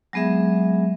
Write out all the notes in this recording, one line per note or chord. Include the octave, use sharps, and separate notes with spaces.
F#3 G#3 B3 G#4 E5